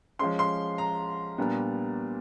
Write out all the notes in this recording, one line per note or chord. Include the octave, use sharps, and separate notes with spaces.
F3 G#3 C#4 C6
C6
A#5
A#2 G3 B3 D4